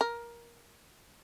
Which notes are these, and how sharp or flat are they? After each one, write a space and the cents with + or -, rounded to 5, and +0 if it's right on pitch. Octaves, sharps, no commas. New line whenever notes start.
A#4 +15